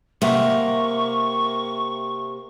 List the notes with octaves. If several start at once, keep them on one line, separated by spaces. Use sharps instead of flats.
C3 A#3 E5 F#5 C#6